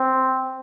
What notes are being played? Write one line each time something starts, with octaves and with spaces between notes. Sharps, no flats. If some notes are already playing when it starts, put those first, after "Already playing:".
Already playing: C4